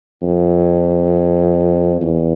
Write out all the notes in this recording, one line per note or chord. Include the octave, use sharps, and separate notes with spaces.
F2
E2